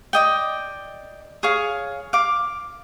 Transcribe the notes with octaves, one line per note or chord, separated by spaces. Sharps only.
D5 D#5 G5
G#4 C#5 F5
F5 D6